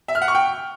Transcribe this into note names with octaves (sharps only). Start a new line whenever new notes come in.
E5
F6
F#5
C#6
G5